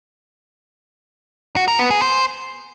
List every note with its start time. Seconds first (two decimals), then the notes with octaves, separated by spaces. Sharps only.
1.56 F#4
1.68 A#4
1.79 B3
1.90 G#4
2.02 C5